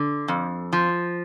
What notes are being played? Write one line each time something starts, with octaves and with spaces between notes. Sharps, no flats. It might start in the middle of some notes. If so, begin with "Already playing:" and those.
Already playing: D3
F2
F3